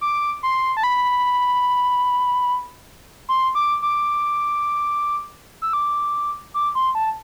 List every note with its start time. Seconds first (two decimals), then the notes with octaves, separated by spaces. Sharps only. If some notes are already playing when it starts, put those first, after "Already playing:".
0.01 D6
0.43 C6
0.77 A5
0.83 B5
3.29 C6
3.55 D6
3.82 D6
5.62 E6
5.73 D6
6.54 D6
6.75 C6
6.95 A5